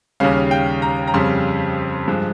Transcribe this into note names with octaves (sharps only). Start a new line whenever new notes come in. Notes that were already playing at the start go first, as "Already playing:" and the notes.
D#2 C#3 G3 C#4 F5
G5
A#5
A#5
F2 C#3 G3 C6
G2 F3 G#3